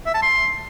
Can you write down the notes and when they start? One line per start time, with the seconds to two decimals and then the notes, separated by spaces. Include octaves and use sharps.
0.06 E5
0.14 A5
0.22 C6